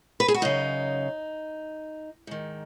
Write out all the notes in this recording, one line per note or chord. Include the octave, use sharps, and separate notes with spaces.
B4
G#4
F#4
F#2 C#3 D#4
G#2 D#3